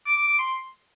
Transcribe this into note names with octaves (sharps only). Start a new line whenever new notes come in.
D6
D6
D6
C6